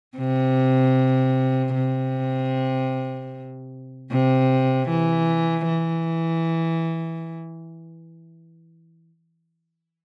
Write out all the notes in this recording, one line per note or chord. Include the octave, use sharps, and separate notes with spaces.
C3
C3
C3
E3
E3